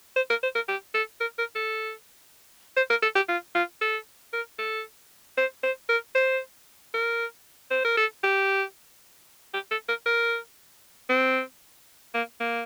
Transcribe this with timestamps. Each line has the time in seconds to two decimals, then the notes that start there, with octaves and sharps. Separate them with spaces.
0.16 C5
0.30 A#4
0.43 C5
0.55 A#4
0.68 G4
0.94 A4
1.21 A#4
1.38 A#4
1.55 A4
2.77 C5
2.90 A#4
3.02 A4
3.15 G4
3.29 F4
3.55 F4
3.81 A4
4.33 A#4
4.58 A4
5.37 C5
5.63 C5
5.89 A#4
6.15 C5
6.94 A#4
7.71 C5
7.85 A#4
7.97 A4
8.23 G4
9.54 G4
9.71 A4
9.88 A#4
10.06 A#4
11.09 C4
12.14 A#3
12.40 A#3